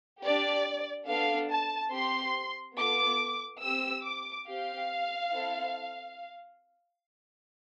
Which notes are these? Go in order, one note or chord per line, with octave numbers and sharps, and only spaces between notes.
D4 G4 D5
B3 D4 A4 F5
A5
C4 G4 C6
B3 F4 A4 D6
C4 G4 E6
D6
C4 G4 F5
C4 E4 A4